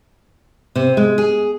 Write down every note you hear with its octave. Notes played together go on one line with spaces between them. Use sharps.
C3
G#3
G#4